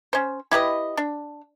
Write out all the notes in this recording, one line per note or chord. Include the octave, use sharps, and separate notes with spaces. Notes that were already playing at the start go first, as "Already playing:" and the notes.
C#4 C5
E4 G4 B4 D#5
D4